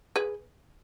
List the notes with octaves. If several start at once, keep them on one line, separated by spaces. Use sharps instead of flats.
G#4 B4